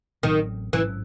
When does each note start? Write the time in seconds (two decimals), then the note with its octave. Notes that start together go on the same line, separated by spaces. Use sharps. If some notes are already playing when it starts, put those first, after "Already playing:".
0.23 A1 A2 D#3 F#3 C4
0.73 A1 G#2 E3 F#3 C#4